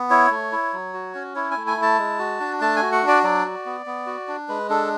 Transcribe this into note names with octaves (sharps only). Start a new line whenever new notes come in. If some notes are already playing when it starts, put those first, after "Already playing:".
Already playing: B3
E4 C#5
A3
E4
F#3
F#4
C#4
E4 C#5
G#5
A3
G#5
E4
A5
G#3
F#4
D4
A3 A5
G#5
F#4
F#5
D4
D5
F#3 D5
F#4
B3
B3
F#4
D4
G#3 B4
D4 A4